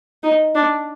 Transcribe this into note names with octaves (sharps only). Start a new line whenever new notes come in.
D#4
D4